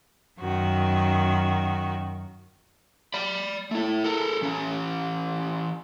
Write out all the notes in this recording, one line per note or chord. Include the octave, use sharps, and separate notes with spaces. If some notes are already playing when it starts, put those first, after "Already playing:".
F#2 D#3 F#4
D5 B5
A3 E4
A4 A#4
E3 C#4